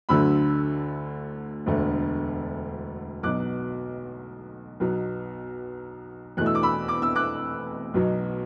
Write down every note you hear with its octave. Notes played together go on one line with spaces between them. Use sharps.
D2 D3 F#3 A3 B5 E6
E1 D2 D3 A3
B1 B2 F#3 D6 F#6
B1 B2 F#3
E2 B2 A3 F#6
E6
D6
B5 E6
D6
E6
D6 F#6
B1 B2 F#3